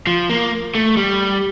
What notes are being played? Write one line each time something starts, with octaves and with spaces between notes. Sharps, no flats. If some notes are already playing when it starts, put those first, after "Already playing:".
F3
A#3
A3
G3